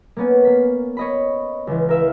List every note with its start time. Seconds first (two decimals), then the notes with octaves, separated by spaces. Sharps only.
0.16 A#3 B3 C#4
0.45 A#3 B6
0.97 C#5 D#5 B5
1.67 C#2 E3
1.89 A#4 E5 F5